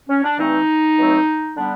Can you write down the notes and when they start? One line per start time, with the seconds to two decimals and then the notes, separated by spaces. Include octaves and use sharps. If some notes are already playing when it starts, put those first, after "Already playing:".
0.09 C#4
0.24 D4
0.38 G2 E3 A3 C4 D#4
0.97 C#2 B2 F#3 A3 C4
1.55 D3 G3 B3 D4